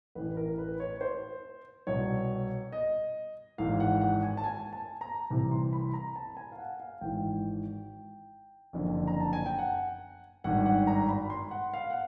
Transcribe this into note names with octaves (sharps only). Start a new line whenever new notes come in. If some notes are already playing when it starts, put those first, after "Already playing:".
A1 A2 E3 B4
A#4
B4
C#5
C5
C2 B2 C#5
D#5
G#1 G#2 E3 F5
F#5
F#5
G#5
A5
G#5
A5
A#5
C2 C3 E3 A#5
C6
B5
A#5
A5
G#5
F5
F#5
F5
G#1 G#2 E3 G5
F#1 F2 D3
A#5
A5
G#5
G5
F#5
G#1 G2 D#3 F#5
F#5
A#5
B5
C6
F#5
F5
F#5